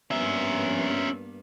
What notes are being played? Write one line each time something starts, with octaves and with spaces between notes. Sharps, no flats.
G2 A#3 B3 C#4 E5